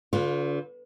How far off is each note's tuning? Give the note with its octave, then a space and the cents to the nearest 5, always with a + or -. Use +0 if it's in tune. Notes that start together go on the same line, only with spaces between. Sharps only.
D3 -40 F4 +20 B4 +0